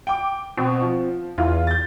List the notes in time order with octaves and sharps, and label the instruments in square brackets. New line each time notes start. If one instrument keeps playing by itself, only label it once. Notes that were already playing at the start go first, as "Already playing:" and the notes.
[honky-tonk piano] G5 D6
[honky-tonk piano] B2 [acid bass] C4
[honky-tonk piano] F3
[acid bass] E2 [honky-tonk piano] E3 F4
[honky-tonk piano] G6 A6